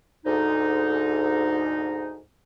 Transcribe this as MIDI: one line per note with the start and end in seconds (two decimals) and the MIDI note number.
0.25 2.19 38
0.25 2.19 44
0.25 2.19 63